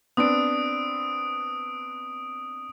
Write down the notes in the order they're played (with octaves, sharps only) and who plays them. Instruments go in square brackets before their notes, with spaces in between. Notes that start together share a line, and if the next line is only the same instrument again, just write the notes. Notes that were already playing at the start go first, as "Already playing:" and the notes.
[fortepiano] B3 C4 D4 [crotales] D#6 D7